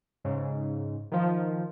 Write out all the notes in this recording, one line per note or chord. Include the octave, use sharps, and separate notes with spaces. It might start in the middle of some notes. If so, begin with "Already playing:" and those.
G#2 C#3
D#3 F3